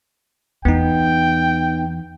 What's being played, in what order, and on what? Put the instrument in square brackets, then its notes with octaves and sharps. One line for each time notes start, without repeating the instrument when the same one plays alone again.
[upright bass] E2 [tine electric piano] B3 D#4 [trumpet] G5